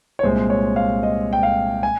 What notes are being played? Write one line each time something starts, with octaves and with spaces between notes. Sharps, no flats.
C#5
C2 A#2 G#3 C5
C#5
F5
D#5
G5
F5
G#5